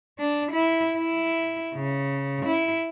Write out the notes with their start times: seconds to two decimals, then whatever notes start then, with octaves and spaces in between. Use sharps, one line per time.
0.18 D4
0.52 E4
0.98 E4
1.75 C#3
2.46 E4